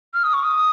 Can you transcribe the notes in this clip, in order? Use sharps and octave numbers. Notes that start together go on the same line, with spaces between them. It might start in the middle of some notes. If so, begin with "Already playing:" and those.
F6
D#6
C#6
D#6